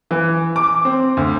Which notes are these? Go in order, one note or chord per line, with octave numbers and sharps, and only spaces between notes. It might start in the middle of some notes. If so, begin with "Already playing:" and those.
E3
D6
C4
D2